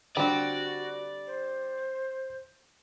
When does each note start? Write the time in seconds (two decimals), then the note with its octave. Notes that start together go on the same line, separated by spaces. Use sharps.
0.17 D3 G3 C4 F#4 D5
1.27 C5